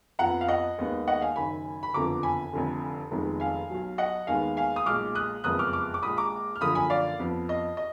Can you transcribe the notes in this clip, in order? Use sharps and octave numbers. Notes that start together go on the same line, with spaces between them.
F2 F3 B3 F#5 A#5
F5
D#5 F#5
D#2 D#3 G#3 B3
D#5 F#5
F5 G#5
F#1 F#2 D#3 G#5 B5
B5
F#1 F2 D3 F3 B3 A#5 D6
G#5 B5
F1 F2 D3
F1 F2 D#3 G#3 B3
F5 G#5
B1 B2 F#3
D#5 F#5
D#2 D#3 G#3 B3 F5 G#5
F5 G#5
D#6
B1 A#2 G#3 D6 F6
D#6 F#6
F#1 F2 F3 G#3 B3 D#6 F#6
D6 F6
D6 F6
D6
A#1 A#2 G#3 B5 D#6
A#5 D6
F6
F#2 D3 F3 A#3 B5 D#6
G#5 B5
D5 F5
F2 F3 B3
D#5
D#5